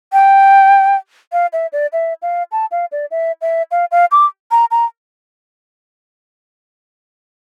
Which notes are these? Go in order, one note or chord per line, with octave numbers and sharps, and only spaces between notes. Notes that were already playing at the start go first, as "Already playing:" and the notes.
G5
F5
E5
D5
E5
F5
A5
F5
D5
E5
E5
F5
F5
D6
A#5
A#5